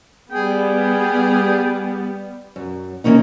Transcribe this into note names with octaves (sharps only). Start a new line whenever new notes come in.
G3 B3 G#4 G5
F#2
E3 A#3 C#4 D#4